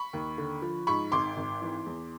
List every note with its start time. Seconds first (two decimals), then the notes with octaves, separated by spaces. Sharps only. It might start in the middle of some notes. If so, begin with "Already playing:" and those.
Already playing: B5 C#6
0.13 D#2
0.38 D3
0.62 F3
0.87 G#2 B5 C#6
1.12 G#1 C6 D6
1.37 G#1
1.62 E3
1.86 E2